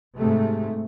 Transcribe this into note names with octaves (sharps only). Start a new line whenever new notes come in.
G#2 C3 A3